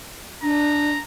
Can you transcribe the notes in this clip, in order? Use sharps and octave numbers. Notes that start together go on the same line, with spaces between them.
D4 A#5